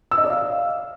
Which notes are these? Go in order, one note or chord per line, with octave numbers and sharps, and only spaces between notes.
E6
D#5
D5
F5